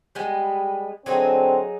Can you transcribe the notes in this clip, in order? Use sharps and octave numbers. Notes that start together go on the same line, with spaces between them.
G3 G#3 B3
D3 F#3 C4 D#4 G#4